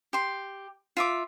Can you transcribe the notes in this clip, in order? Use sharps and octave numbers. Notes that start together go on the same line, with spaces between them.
G4 C6
F4 E5 D6